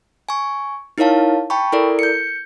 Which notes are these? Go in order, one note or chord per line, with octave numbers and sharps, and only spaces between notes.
G#5 C#6
D#4 E4 A#4 C#5 F5 A5
G5 A5 B5 C#6
E4 A4 A#4 D5
G6 C#7